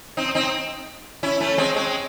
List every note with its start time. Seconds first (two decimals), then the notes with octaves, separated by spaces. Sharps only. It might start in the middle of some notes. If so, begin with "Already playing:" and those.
0.17 C4 D#4
0.35 C4 D#4
1.23 C#4 E4
1.40 A3 C#4
1.58 G#3 C4
1.76 G#3 C4